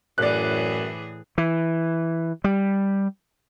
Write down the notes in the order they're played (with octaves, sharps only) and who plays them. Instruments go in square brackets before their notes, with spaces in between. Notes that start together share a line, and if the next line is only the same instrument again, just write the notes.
[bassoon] F#2 [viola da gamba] A2 E3 G#4 [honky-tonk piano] D5 F#6
[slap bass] E3
G3